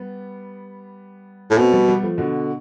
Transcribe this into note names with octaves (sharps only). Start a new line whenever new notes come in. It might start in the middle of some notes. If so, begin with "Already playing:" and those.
Already playing: G3 B3
A2
B2 A3 C4
G3 B3
G3 B3
F3 A3
B2 D3